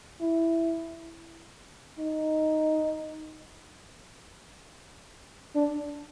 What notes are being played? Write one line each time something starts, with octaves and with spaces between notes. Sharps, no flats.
E4
D#4
D4